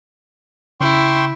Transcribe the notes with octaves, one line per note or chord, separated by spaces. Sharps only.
C#3 E4 G5 C6 C#6